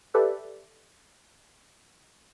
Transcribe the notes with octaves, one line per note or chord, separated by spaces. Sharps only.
G4 A4 B4 D5 E5